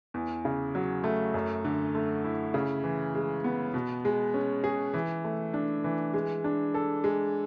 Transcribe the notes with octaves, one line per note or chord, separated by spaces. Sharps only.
E2
C#3
F#3
A3
F#2
D3
A3
E4
C#3
E3
G#3
B3
B2
G#3
C#4
G#4
E3
A3
D4
E3
G#3
D4
A4
G#3